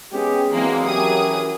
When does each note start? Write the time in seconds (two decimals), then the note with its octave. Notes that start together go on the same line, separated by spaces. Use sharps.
0.13 G#3 B3 C#4 G4 G#4
0.53 E3 F#3 G#3 A#3 C4
0.87 C#4 G4 G#4 A#4 D#6